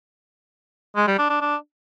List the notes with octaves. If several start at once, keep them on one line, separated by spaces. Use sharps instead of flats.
G#3
G3
D4
D4
D4